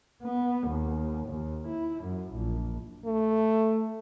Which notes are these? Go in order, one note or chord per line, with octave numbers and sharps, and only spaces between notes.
B3
D#2
D#2
E4
F#2
A#1
A3